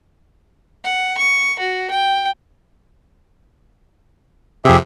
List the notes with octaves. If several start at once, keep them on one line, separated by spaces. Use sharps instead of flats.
F#5
C#6
F#4
G5
F2 C3 G4 G#4 E5